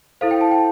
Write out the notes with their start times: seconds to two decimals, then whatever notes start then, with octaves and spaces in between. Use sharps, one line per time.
0.21 E4 A4 C5 F5
0.31 G5
0.41 A5
0.51 G5